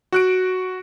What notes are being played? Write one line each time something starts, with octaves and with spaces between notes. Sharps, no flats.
F#4 F#6 D7